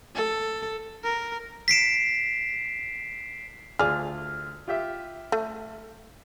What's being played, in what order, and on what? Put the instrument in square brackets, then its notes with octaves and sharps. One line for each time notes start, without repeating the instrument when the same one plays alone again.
[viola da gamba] A4
[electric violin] A#4
[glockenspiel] B6 C7 D7 E7
[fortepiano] D2 F4 [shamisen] G#4 D5 [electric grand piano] F6
[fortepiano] F4 G4 E5
[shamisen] A3